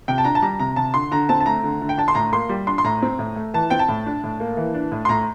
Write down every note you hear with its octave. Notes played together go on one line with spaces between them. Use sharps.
C3 G5
A5
D4 A#5
A5
G3 A#5
C3 A#5
C3 A5
D3 C6
D3 A#5
C4 A5
A5
A3 A#5
D3
D3
G5
D4 A5
C6
A2 A#5
A#3 C6
G3
D4 C6
C6
A2 A#5
C4
A2
A3
E3 A5
C4 G5
A5
A2
D4
A2
A#3
E3
D4
A2
C6
A2 A#5